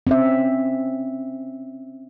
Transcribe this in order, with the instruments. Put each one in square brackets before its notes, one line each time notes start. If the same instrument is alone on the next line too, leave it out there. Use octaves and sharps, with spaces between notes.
[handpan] C4 C#4 E5